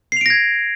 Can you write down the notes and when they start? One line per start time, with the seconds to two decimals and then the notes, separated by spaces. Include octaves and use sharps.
0.12 C7
0.17 F7
0.21 D7
0.26 A#6
0.30 G#6